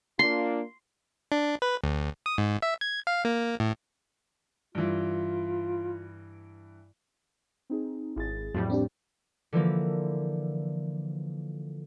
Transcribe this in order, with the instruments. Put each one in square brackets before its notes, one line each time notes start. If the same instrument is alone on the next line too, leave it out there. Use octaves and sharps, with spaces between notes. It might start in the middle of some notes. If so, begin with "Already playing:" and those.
[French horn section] A#3 D4 F4 [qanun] C6
[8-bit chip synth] D4
B4
D2
D#6
G#2
E5
G#6
F5
A#3
A2
[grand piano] G2 E3 [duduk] F4
[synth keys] C4 D#4 G#4
[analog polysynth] G#1 [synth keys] E4 G#4 A6
[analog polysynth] F2 A2 G3 [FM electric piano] F#3
[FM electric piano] C4 D4 G4
[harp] D3 E3 F3 A#3